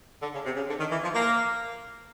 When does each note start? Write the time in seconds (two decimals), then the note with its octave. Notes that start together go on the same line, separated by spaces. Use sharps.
0.23 D3
0.34 C#3
0.45 C3
0.56 C#3
0.69 D3
0.80 D#3
0.91 E3
1.03 F3
1.14 A#3